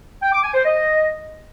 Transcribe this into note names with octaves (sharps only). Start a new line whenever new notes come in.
G5
D6
G#5
C5
D#5